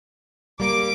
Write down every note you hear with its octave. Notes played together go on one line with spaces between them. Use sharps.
G3 A#3 D6